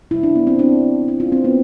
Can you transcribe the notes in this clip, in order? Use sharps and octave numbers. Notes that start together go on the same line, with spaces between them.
C3 G3 E4
D4
B3
C4
D4
E4
F4
C4
B3